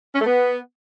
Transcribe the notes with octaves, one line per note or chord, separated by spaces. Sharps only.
C#4
A3
B3